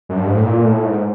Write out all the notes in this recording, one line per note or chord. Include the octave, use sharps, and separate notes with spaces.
F#2
G2
G#2
A2
A#2
A2
G#2